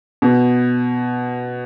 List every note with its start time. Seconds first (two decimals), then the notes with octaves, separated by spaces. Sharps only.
0.22 B2